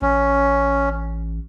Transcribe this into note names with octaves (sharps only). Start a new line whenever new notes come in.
A1 C#4